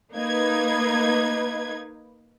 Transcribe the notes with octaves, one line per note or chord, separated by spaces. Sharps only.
A#3 D#4 B4 G#6